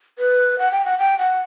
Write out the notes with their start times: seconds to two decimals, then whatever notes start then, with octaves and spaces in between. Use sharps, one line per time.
0.19 B4
0.59 F#5
0.72 G5
0.85 F#5
0.98 G5
1.18 F#5